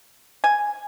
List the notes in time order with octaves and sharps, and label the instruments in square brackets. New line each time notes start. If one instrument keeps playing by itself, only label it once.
[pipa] G#5